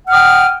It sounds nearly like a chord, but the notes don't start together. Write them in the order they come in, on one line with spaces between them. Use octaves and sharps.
F#5 F6 D#6 G5